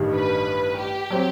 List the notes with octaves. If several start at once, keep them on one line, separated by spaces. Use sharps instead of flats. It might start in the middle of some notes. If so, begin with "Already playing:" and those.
Already playing: A1 G2 D#3 G3
B4
G4
F#3 C4